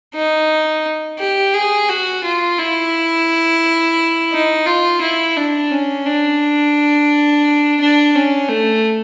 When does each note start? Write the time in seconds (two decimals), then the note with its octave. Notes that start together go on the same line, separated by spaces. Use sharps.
0.14 D#4
1.19 G4
1.53 G#4
1.89 F#4
2.24 F4
2.58 E4
4.32 D#4
4.66 F4
5.01 E4
5.37 D4
5.71 C#4
6.06 D4
7.81 D4
8.15 C#4
8.49 A3